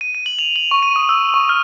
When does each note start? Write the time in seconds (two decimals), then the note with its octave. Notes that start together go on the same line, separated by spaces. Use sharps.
0.01 D#7
0.15 D#7
0.26 F#7
0.39 F7
0.56 F#7
0.71 C#6
0.83 D#7
0.96 D#6
1.09 E6
1.34 C#6
1.49 F6